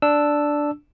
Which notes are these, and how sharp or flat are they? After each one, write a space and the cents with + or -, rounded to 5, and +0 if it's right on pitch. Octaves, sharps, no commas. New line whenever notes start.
D4 +0 E6 +0